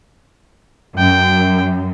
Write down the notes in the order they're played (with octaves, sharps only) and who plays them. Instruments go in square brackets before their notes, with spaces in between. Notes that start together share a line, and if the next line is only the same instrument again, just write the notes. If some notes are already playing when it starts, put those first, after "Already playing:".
[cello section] F#2 [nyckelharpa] G5